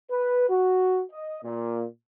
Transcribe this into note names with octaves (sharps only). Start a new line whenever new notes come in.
B4
F#4
D#5
A#2